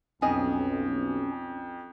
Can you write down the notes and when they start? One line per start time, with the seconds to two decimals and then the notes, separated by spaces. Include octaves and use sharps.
0.22 B1 F2 C#4 G#4 D#5